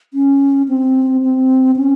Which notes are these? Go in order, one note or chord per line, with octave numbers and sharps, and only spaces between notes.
C#4
C4
C4
C#4